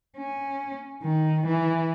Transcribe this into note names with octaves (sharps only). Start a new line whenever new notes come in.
C#4
D#3
E3